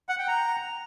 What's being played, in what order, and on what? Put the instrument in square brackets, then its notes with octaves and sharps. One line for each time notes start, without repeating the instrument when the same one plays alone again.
[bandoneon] F#5
G5
A#5